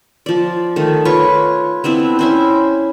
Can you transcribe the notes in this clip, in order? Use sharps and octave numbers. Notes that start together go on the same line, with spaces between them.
F3 D5
D#3 A3
F4 B4 C#5 C#6
B3 C4 D4 E4
C#4 E4 C5